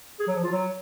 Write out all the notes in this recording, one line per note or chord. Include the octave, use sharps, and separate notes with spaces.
G#4
F#3
F3
F4
F#3